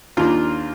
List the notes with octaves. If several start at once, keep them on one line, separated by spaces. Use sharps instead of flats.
D#2 D#3 A#3 D4 F4